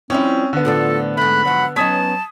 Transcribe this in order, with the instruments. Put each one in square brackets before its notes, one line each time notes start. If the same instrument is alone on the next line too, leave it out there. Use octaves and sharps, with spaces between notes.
[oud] F3 G3 E4 [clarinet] C4 [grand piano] C#4
[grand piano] D3 B3
[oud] A2 F3 D4 [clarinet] F4 [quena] A4
[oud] G#2 A3 [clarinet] B5 [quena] F#6
[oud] G#2 F3 F#3 [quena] F#5
[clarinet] F#3 [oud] B3 C#4 D#4 [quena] A5 [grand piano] D#6 G#6 B6